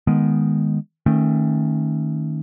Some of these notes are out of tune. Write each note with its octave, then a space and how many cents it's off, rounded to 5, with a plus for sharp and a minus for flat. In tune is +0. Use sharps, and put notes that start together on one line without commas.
D#3 +0 G#3 +0 B3 -15
D#3 +0 A3 +15 C#4 -30